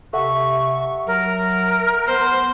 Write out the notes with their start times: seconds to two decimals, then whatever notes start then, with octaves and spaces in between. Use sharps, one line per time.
0.13 C3 A4 E5 F#5 C#6
1.07 F#3 A#4
2.07 B3 C5